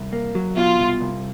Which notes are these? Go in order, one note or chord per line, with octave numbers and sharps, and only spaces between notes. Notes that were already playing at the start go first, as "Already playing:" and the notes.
Already playing: C2
A#3
F#3
B2 F4
C2
C2